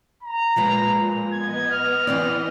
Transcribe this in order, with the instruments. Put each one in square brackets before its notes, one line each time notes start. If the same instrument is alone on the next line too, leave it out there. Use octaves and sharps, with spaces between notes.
[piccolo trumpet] A#5
[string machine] A#2 [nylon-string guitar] F3 G#3 B4
[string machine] B3 D#5 [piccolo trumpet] G#6
[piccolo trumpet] F6
[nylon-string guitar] E3 C4 D5